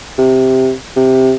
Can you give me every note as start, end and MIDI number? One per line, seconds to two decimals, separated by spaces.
0.18 0.72 48
0.97 1.34 48